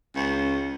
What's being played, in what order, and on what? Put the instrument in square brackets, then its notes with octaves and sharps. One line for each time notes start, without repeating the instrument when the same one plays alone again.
[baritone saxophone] C#2